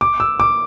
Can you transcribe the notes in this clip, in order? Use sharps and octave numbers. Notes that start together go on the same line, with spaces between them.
D6
E6
D6